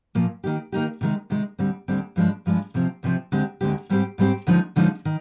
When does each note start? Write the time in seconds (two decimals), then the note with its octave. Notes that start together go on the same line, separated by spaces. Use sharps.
0.15 A#2 F3 A#3
0.44 D#3 A#3 D#4 G4
0.72 D#3 A#3 D#4 G4
1.01 C3 D#3 G#3
1.30 C3 D#3 G#3
1.59 D2 D3 G3 C4
1.88 D2 D3 G3 C4
2.16 G2 F3 G#3 D4
2.46 G2 F3 G#3 D4
2.74 D2 C3 F3 C4
3.03 D2 C3 F3 C4
3.32 D2 D3 G#3 C4 G4
3.61 D2 D3 G#3 C4 G4
3.89 G#2 G3 C4 G4
4.18 G#2 G3 C4 G4
4.47 D2 D3 F3 G#3 D#4
4.76 D2 D3 F3 G#3 D#4
5.05 D#3